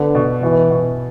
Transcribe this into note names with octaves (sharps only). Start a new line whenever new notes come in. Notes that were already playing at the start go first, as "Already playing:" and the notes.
Already playing: D3 B3
B2
B2 E3
B2